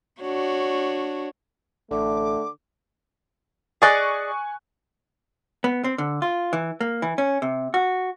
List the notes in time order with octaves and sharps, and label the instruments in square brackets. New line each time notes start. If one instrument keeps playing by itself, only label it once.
[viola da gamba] D4 F#4 C#5
[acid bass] A1 [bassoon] D3 [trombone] A3 [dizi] D6
[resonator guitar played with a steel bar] G#4 D5 D#5 [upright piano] G#5 C#6 F#6
[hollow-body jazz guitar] B3
C4
D3
F4
E3
A#3
E3
C#4
C3
F#4